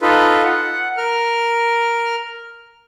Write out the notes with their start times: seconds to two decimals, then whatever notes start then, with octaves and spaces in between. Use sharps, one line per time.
0.01 D#4 F4 A4 B4
0.44 F#5
0.97 A#4 F6